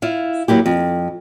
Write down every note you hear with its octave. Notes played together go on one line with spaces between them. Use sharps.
E4 F4 F5
F#3 A#3 E4 G4
F2